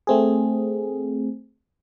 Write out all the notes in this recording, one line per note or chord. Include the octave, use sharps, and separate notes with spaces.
A3 C4 G#4